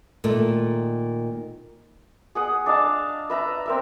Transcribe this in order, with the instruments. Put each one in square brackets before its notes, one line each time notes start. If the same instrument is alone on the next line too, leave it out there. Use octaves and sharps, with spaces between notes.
[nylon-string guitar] A#2 D#3 A3
[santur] G#4 F#5 D#6
D4 D#5 F5 A5
B4 E5 A#5
C4 A#4 E5